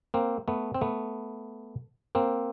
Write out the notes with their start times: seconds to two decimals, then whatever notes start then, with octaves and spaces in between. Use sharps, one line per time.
0.14 A#3 C4
0.48 A3 B3
0.74 C4
0.81 A3 B3
2.15 A#3 C4